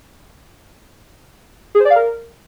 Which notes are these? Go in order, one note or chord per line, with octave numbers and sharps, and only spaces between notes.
G#4
C5
D5
F5
A#4